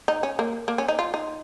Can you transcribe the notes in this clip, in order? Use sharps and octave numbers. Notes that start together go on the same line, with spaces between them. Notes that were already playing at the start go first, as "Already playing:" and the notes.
D#4
C#4
A#3
A#3
C#4
D#4
F4
D#4